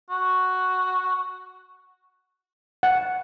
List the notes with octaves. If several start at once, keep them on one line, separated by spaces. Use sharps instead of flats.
F#4
F#5